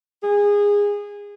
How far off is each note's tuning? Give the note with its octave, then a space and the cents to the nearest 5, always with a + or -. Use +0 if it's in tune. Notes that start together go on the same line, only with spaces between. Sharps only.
G#4 -20